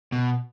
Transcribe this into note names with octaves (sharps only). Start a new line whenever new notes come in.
B2